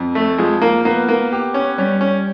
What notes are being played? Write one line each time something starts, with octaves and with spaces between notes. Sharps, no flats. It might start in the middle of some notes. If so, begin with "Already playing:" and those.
Already playing: F2
A3
F3 G#3
A#3
A#3 B3
A#3
G4
C#4
G3 C#4
C#4